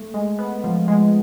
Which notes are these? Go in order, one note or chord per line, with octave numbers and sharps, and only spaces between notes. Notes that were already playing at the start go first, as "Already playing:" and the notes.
Already playing: A3
G#3
B3
F3
G#3